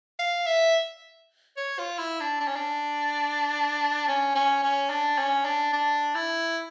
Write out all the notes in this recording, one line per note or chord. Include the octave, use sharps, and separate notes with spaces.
F5
E5
C#5
F4
E4
D4
D4
C#4
D4
C#4
C#4
C#4
D4
C#4
D4
D4
E4